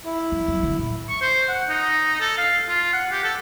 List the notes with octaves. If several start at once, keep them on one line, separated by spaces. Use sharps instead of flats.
E4
F#3
F#2
D3
A#2
C#6
C5
F#5
D#4
A4
F5
F4
F#5
G4
A4